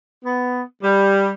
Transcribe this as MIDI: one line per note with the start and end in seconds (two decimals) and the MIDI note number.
0.24 0.62 59
0.83 1.30 55